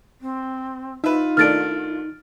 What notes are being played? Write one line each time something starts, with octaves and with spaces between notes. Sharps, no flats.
C4
D#4 F4 B4 E5
D#3 A3 D4 F6 A6 D7